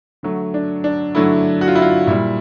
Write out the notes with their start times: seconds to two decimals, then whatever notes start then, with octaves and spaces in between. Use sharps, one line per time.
0.23 D3 F#3 A3
0.54 D4
0.84 D4
1.15 D3 F#3 A3 E4
1.61 F#4
1.68 F4
1.75 E4
1.82 F4
2.07 A#2 G3 E4